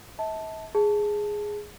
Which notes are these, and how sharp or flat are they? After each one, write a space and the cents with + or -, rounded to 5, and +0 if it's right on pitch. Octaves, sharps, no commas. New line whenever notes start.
E5 -45 A5 +0
G#4 +0 A5 +0